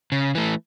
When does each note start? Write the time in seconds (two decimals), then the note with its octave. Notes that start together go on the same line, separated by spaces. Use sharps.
0.12 C#3
0.35 E3 A3